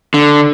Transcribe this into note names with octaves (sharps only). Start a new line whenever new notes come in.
D3